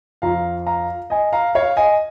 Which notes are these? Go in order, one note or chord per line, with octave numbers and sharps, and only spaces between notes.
F2 F3 F5 A#5
F5 A#5
D#5 G#5
F5 A#5
C#5 F5
D#5 G#5